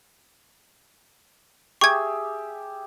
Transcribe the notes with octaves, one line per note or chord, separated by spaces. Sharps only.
G4 G#4 E5 C#6 G#6